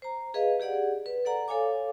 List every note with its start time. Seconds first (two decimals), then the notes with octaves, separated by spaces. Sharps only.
0.02 C5 A#5
0.34 G#4 B4 D#5 F5
0.60 G4 G#4 D5 F#5
1.06 B4
1.25 A4 D5 F#5 A#5
1.48 A4 C#5 F5 G#5 D6